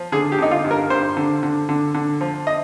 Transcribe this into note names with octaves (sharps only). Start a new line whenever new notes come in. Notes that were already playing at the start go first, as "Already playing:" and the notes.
Already playing: F3
D3 G#4
G4
D3 D#4
F4
G2
A#4
G2 C5
D3
D3
D3
D3
F3
D#5